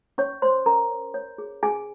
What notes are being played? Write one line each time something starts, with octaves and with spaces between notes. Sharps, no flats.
C#4 C#5 C#6
C5 C#5 C6
C#4 A#4 A#5
C#5
C#5
G#4
C#4 G#4 G#5